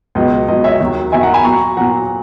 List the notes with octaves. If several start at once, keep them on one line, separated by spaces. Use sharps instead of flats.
C#2 B2 F#3 D#5
C#2 B2 F#3 D#5
C#5 E5
D#2 D#3 F#3
D#2 D#3 F#3 E5 G#5
F#5 A#5
G#5 B5
A#2 F#3 A#5 C#6
A#2 F#3 F#5 A#5